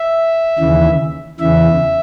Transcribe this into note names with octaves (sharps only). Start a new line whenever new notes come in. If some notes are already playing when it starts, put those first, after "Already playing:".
Already playing: E5
D#2 C#3 E3
E2 C#3 E3 E5